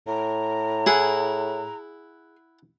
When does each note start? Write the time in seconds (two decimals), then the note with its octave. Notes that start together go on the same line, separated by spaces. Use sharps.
0.07 A2 A#5
0.86 E4 G#4 F#5